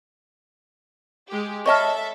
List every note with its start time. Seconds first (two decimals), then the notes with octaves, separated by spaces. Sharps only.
1.29 G#3 G4
1.66 A4 C#5 D#5 E5 A5 B5 C#6 F6